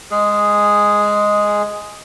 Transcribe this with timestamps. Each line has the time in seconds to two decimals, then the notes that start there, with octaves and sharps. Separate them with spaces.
0.11 G#3 G#4